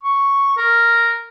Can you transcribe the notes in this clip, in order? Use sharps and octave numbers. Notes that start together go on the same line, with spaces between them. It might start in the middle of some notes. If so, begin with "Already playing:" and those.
C#6
A#4